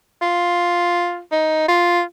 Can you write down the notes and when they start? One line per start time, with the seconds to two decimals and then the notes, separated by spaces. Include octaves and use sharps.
0.22 F4
1.32 D#4
1.68 F4